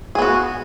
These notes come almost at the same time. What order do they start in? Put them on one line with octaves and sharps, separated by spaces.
G#4 B3 F#4